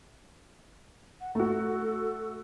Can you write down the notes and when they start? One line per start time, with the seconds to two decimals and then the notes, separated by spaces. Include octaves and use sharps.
1.21 F#5
1.35 A3 F#4 A4